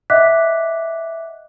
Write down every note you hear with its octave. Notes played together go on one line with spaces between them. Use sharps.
D#5 E5 F#5 D6 F#6 B6